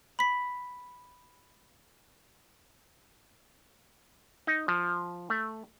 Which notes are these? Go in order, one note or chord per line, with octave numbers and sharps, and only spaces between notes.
B5 B6
D#4
F3
A3